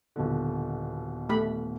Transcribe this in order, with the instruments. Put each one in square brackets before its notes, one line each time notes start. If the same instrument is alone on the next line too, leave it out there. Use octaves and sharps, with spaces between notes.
[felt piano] D#1 B2 D3
[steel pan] A3 G4 B5